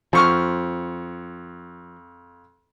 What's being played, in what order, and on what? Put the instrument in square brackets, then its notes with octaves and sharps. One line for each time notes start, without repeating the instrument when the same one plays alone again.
[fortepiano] F2 C#6 F6 [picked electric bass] F3